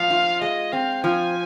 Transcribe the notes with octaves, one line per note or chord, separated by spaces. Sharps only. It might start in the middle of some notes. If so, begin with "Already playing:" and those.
Already playing: F3 F5
F4
G#3 D#5
C4 F5
F3 G#5